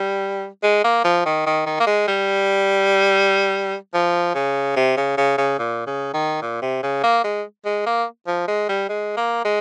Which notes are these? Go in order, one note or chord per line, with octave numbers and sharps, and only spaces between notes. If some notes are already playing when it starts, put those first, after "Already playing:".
Already playing: G3
G#3
A#3
F3
D#3
D#3
D#3
A#3
G#3
G3
F3
C#3
C3
C#3
C#3
C#3
A#2
C#3
D#3
A#2
C3
C#3
A#3
G#3
G#3
A#3
F3
G#3
G3
G#3
A#3
G#3